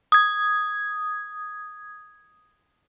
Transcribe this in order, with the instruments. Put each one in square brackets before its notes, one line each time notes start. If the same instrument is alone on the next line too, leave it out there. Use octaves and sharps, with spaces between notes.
[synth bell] D#6 G#6